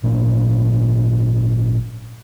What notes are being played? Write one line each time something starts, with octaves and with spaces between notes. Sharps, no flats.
G#1 A#2 A#3 D4